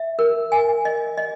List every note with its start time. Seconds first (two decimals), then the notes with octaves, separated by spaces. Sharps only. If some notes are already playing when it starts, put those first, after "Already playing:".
Already playing: E5
0.19 A#4
0.52 G#5
0.85 D#5
1.17 D#5